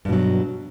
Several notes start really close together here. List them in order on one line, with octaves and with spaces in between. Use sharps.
G2 B2 F#3